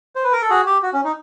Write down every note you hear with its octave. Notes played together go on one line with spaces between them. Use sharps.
C5
B4
A#4
A4
F#4 G#4
G4
F#4
C#4
D#4